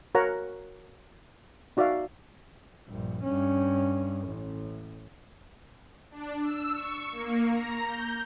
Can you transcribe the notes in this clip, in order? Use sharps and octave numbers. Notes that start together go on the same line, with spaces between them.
F#4 A#4 C#5 F#5 A#5
D#4 F#4 D5 E5 F5
A#1 G2
G2 C#4
A1
D4
E6
C#6
A#3
A#5
G6